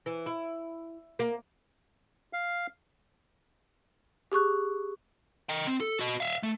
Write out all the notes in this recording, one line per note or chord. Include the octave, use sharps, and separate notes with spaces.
E3
E4
A#3
F5
G4 G#4 C#6 F#6
D#5 G5
C4
A4
F#4 D#5
E5 F5
A3